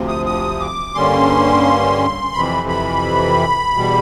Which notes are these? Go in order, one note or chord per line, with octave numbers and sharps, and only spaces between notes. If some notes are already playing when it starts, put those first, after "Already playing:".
Already playing: D2 C3 F3
D#6
D#6
D6
G2 D3 G3 A#3 C#4 C6
F2 C3 E3 B5
B5
E2 B2 G3